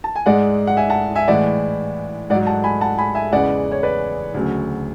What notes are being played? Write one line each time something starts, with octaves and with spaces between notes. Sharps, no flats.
A5
G#5
G#2 G#3 D5 F#5
F#5
E5 G#5
F#5 A5
E5 G#5
A2 E3 G#3 D5 F#5
G#2 F#3 D5 F#5
F#5 A5
G#5 B5
F#5 A5
G#5 B5
E5 G#5
E2 C#3 E3 G#3 D5 F#5
C#5
B4 D5
D2 C#3 F#3